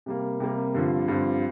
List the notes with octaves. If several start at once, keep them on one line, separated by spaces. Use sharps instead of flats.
C3 G3 A#3
C3 G3 A#3
G2 D3 F3 C4
G2 D3 F3 C4